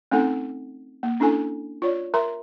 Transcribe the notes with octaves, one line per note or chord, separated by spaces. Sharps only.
A3 C4 C#4 D#4 A4 F#5
A#3
C#4 D4 E4 A4 G#5
F4 C#5 D5
A#4 E5 A#5 C6